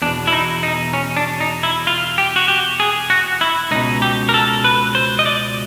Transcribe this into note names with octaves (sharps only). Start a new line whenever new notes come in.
E2 B2 D4
E4
D#4
D#4
C#4
D4
D#4
E4
F4
G4
F#4
G4
G#4
F#4
E4
C#2 B2 D#4
G4
A#4
A4
B4
C5
D#5
D5